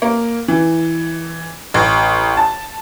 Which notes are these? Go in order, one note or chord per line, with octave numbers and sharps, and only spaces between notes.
A#3
E3
A1
A5